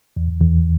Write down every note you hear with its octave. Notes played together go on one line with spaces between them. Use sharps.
E2
E2